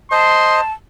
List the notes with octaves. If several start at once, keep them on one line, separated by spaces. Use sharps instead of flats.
C5 D#5 A5 C6